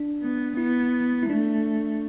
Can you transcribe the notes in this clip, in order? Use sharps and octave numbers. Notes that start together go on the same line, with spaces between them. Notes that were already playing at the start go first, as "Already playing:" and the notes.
Already playing: D4
B3
B3 E4
E4
A3 D4